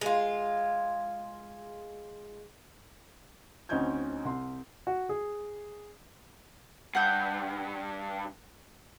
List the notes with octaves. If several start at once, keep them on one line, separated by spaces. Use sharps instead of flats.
G#3 F4
D2 C4 C#4 D#4 G6 G#6
C2 C6
F#4
G#4
G2 F#5 G6